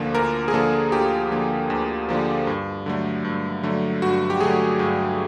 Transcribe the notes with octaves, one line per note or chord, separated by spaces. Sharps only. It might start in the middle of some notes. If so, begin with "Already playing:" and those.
Already playing: D2 D3 F3 A#3
D2 A#4
G#4
D3 F3 A#3 A4
D2 G4
D3 F3 A#3
D2
D3 F3 A#3
G2
D3 F#3 A3
G2
D3 F#3 A3
G2 F#4
G4
D3 F#3 A3 G#4
G2